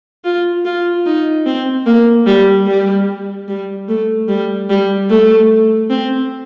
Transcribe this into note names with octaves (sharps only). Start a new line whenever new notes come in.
F4
F4
D#4
C4
A#3
G3
G3
G3
A3
G3
G3
A3
C4